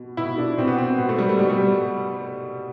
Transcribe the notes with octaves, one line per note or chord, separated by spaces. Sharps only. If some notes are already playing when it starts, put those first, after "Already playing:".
Already playing: B2
B2 E4
D4
B2 C4
B3
C4
B2 B3
A3
G3
A3
B2 G3
G3